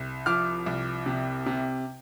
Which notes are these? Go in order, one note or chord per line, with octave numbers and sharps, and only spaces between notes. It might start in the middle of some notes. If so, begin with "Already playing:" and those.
Already playing: C2
F3 D6 F6
C2
C3
C3